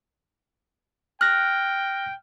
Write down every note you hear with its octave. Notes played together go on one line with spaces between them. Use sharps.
G5 F6 F#6 A#6